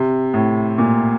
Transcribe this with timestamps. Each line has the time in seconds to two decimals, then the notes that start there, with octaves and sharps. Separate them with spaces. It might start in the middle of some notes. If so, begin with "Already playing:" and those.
Already playing: C3
0.34 A2
0.78 A#2